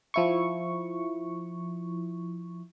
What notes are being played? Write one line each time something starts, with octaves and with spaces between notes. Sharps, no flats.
F3 E4 C#6